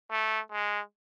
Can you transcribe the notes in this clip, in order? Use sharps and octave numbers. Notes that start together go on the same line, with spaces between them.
A3
G#3